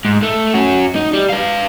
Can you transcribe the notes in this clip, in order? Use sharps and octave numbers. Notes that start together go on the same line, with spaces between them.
G#2
A3
C#4 F#4
D#4
G3
B4 F5